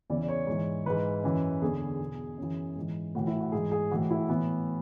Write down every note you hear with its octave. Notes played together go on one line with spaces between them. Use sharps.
E2 C#3 E3 D5
D5
C#5
G#2 E3
G#2 E3 B4
F#2 E3
E2 D3 G#4
E2 B2
F#2 E3
G#2 E3
A2 E3 F#4
E4
F#4
G#2 E3 G#4
G#4
A2 E3 F#4
E4
A2 E3 B3